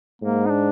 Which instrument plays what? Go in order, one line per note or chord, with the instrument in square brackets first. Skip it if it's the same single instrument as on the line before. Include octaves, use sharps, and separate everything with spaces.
[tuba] G#2 [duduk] A#3
[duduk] D#4
D4